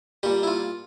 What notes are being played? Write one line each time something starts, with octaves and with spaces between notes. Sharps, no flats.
A#2 G3 G4
E4
F4